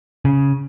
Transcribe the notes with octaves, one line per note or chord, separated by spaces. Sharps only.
C#3